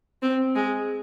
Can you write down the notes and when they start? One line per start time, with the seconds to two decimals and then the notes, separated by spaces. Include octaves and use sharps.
0.22 C4
0.55 G#3